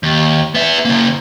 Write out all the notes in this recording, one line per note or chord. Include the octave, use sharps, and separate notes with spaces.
D#2
B3 E5
C#3 A#3